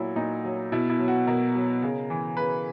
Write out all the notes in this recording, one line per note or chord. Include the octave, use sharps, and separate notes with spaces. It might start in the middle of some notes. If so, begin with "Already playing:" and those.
Already playing: A#2 F#3 E4 F#4
A#2 D#4
F#3
B2 E4
E4
F#3
F#4
B2 A#4
F#3
C#3
E3
C#3 B4